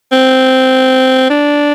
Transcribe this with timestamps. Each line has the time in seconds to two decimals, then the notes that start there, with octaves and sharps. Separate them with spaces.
0.12 C4
1.30 D4